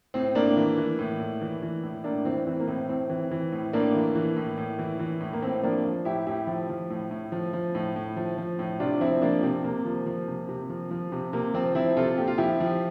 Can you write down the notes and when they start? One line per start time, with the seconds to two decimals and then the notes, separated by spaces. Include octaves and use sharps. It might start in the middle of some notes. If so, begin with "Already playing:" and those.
0.14 A2 C4
0.35 A2 A#3 D4
0.57 E3
0.78 E3
0.99 A2
1.20 A2
1.41 E3
1.63 E3
1.83 A2
2.04 A2 A#3 D4
2.25 E3 C4
2.47 E3 C4
2.60 A#3
2.67 A2 C4
2.89 A2 C4
3.10 E3
3.31 E3
3.52 A2
3.73 A2 A#3 D4
3.95 E3
4.15 E3
4.37 A2
4.58 A2
4.79 E3
4.99 E3
5.20 A2
5.33 A#3
5.42 A2 C4
5.63 F3 A#3 D4
5.84 F3
6.05 A2 E4 G4
6.27 A2 E4 G4
6.47 F3
6.69 F3
6.90 A2
7.11 A2
7.32 F3
7.53 F3
7.75 A2
7.96 A2
8.17 F3
8.38 F3
8.59 A2
8.80 C3 D4 F4
9.01 F3 C4 E4
9.22 F3 A#3 D4
9.43 C3 C4
9.64 C3 A#3
9.85 F3
10.06 F3
10.28 C3
10.48 C3
10.69 F3
10.91 F3
11.12 C3
11.33 C3 A#3
11.54 F3 C4
11.75 F3 C4 E4
11.97 C3 F4 A4
12.18 A#2 G4
12.27 F4
12.38 F3 E4 G4
12.60 F3